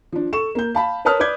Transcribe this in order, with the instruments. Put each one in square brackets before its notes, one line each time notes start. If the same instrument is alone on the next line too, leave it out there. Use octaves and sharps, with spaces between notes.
[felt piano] F3 D4
A4 C#6 E7
A#3 G6
F5 A5 B5
A#4 B4 C#5 A5 D#6 F6
B4 D5 D6 G6 G#6